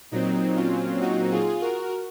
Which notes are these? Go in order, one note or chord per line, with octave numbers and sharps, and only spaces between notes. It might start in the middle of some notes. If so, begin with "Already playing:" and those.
A#2 F#3 C4 D#4
C#4 F4
D#4 F#4
F4 G#4
F#4 A#4